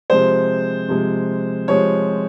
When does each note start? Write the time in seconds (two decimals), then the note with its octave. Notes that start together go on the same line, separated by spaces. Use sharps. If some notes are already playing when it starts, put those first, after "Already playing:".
0.10 C3 F3 G#3 C5
0.88 C3 F3 G#3
1.68 C3 F3 G#3 C#5